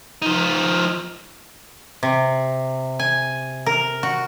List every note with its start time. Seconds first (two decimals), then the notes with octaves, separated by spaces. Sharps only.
0.22 F3 D#4
2.03 C3
2.99 G#5
3.66 A#4
4.03 F#4